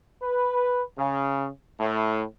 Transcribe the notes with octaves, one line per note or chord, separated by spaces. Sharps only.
B4
C#3
A2